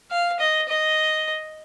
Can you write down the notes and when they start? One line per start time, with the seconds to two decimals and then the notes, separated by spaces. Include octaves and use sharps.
0.11 F5
0.40 D#5
0.69 D#5